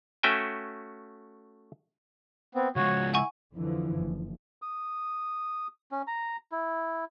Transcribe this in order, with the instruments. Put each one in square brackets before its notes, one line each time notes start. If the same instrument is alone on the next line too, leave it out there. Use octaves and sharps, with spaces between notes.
[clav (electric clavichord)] A3 C#4 F#4 E5 G5 G#5
[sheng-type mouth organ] B3 C4
[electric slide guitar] C#3 F3 G#3 [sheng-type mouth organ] F#4 C#5
[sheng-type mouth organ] E4 [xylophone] F#5 G#5 C#6
[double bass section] F2 D3 E3 F3
F#1
[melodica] D#6
C#4
A#5
E4